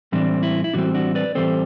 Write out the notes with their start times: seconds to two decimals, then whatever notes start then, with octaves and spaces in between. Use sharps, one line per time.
0.12 A2 E3 G3 C4 D4
0.43 E4
0.64 E4
0.74 A2 E3 G3 C4 D4 F#4
0.94 D4 F#4
1.15 B4 D5
1.35 A2 E3 G3 C4 A4 C5